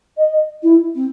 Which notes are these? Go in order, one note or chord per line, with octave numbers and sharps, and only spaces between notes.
D#5
E4
C4